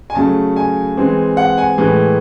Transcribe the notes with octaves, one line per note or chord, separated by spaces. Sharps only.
G#5
C#3 F#3 A3 A5
G#5
E3 G#3 C4
F#5
G#5
A2 E3 G#3